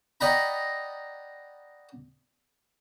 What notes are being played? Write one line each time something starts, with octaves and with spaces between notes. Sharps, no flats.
D5 D#5 F#5 G5 A#5 B5